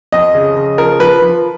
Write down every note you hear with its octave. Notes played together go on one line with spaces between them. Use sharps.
F2 D#5
C#3
C#3
F3 A#4
F3 B4
F3